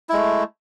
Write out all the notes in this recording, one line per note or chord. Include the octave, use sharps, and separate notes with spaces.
G#3 A3 E4